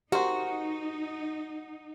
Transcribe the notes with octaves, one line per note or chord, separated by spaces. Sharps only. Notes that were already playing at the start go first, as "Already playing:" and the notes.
D#4 F#4 G4 A#4 C5